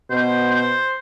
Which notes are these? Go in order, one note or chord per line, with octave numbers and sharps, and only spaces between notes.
B2 C5
C5